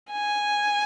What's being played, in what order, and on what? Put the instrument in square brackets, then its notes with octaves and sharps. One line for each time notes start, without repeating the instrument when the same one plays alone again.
[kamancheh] G#5